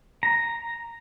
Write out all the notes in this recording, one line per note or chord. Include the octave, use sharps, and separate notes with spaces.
A#5